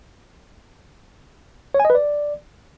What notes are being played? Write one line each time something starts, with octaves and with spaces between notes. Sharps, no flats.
C#5
G#5
D#5
B4
D5